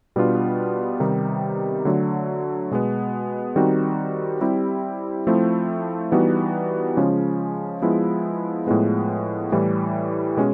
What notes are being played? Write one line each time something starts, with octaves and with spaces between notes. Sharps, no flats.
B2 G3 B3 D4 F4
C3 D#3 G3 B3 D#4
D3 F#3 A3
B2 G#3 B3
D#3 G3 C4 D#4 F#4
G3 C4 E4 G4
F3 A3 C4 E4
E3 G3 B3 D#4 F#4
C#3 F3 G#3 C#4
F3 G#3 B3 E4
A2 F3 G#3 B3
A2 E3 G3
B2 G#3 C#4